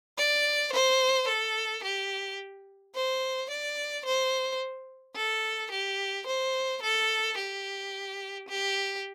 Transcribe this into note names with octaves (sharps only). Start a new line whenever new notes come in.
D5
C5
A4
G4
C5
D5
C5
A4
G4
C5
A4
G4
G4